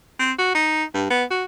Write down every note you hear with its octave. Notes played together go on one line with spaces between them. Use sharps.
C4
F#4
D#4
G2
B3
F#4